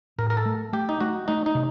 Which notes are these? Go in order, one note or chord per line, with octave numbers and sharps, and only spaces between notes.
A2 A#4
A#4
A4
A3
A3 G4
D#4
A3 F#4
A3 D#4
D#4
C3